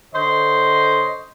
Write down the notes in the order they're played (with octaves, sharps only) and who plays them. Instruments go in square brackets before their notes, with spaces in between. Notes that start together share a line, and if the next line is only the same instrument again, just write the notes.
[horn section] D3 C5 C#5 D#5